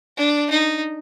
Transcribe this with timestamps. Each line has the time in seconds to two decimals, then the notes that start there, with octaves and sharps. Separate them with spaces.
0.17 D4
0.51 D#4